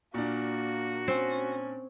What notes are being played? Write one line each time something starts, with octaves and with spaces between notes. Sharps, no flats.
A#2 A#3 D4 F#4
C4 C#4